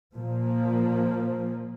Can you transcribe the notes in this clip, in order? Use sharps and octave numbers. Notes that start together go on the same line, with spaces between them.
A#2 F3 A#3